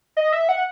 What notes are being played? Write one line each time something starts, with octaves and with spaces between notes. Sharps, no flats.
D#5
E5
F#5